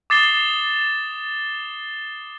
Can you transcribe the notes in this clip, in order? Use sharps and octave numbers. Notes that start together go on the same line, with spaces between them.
D6 D#6 A6 C7 E7 G7